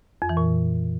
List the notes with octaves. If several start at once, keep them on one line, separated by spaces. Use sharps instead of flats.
F2
E3
A#2